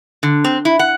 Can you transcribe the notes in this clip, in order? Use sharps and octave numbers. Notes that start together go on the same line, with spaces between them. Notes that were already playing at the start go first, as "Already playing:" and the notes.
D3
C4
E4
F#5